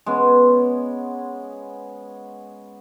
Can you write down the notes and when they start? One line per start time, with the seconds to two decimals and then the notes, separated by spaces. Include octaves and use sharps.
0.06 G#3 B3 C#4